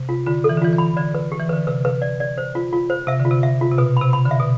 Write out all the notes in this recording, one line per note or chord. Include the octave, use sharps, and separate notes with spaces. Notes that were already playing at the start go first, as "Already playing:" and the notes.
Already playing: C3
F4
D3 F4
A4
E3
D3
E3 F4
E3
B5
D3 D5
B4
G4
E3
D3 B4
C3 B4
B4
D5
D5
C5
F4
F4
C5
C3 E5
D3
F4
C3
E5
F4
C3
B2 B4
B5
C3
B5
D3
E5
B2